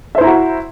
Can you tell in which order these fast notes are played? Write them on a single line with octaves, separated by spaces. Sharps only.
E5 C5 E4 A#5 F#4